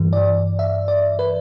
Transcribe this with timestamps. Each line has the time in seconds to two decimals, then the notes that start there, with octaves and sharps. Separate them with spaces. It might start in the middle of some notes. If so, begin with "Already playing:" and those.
Already playing: G2 E3
0.13 D5
0.59 E5
0.88 D5
1.19 B4